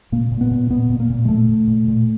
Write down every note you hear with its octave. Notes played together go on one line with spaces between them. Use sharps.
A#2 A#3
A#2
B3
A#2
A#2 B3
A#2
A#3
A#2
G#3
A#2 A3
A#2
A#2
A#2